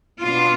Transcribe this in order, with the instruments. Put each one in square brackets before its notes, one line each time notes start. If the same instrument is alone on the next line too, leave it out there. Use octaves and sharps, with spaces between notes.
[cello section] B2 B3 D4 F4